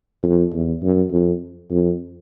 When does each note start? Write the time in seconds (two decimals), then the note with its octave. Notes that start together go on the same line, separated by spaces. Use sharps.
0.23 F2
0.53 E2
0.82 F#2
1.12 F2
1.71 F2